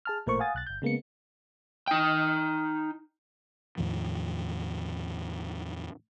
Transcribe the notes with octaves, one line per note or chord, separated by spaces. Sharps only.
G#4 A5 F6
A1 A#2 A3 A#4 C5 C#6
F5 F#5 G#5 D#6 A6
B1 F#6 A6
G1 G6
C#3 G#3 A#3 B3 C#7
D#4 G5
E2 A2 D#3 F3